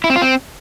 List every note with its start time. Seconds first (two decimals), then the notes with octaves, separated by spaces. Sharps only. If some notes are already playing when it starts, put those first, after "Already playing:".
0.04 E4
0.10 C4
0.16 F4
0.22 C4